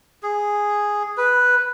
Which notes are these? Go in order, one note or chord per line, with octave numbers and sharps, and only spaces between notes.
G#4
B4